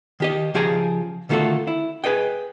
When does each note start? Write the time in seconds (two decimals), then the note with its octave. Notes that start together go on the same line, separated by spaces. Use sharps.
0.20 D#3 G4 D#5
0.54 C#3 F3 G4 G#4 G#5 A#5
1.29 D3 D#3 A3 F4 F#4 A4
1.67 E4
2.04 G#4 B4 D#5 G5